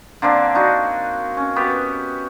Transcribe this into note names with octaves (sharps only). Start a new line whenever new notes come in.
D3 A#3 C4 D4
D4 D#4 F#4
C#4
B3 F#4 G4